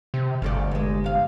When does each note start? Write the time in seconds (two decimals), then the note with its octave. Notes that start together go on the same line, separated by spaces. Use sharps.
0.14 C3
0.42 G1 F3 A3 D5
0.71 A#2 G#3
1.04 C3 F5